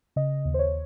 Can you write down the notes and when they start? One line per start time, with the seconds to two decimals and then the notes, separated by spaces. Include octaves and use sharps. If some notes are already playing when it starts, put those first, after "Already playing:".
0.16 C#3 D#5
0.45 D#2
0.54 C5
0.59 C#5